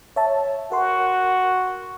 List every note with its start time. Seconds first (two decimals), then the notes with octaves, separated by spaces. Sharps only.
0.16 C#5 E5 A5
0.72 F#4 A#4 C6